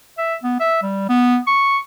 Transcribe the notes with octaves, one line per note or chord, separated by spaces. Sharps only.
E5
B3
E5
G3
B3
C#6